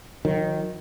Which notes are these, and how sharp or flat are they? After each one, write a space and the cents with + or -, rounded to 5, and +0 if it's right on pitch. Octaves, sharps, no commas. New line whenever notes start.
D#3 +0 F#3 -40